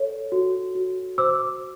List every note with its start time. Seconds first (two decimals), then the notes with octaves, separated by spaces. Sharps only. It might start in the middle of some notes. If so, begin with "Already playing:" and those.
Already playing: A4 C#5
0.32 F#4
0.75 F#4
1.18 C5 D6 E6